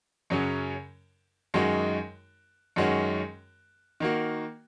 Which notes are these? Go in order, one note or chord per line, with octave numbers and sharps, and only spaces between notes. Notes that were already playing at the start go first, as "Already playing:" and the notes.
F#2 C#3 F#3 C#4
F#2 D#3 G#3 D#4 F#4
F#2 D#3 G#3 C#4 F#4
D#3 A#3 F#4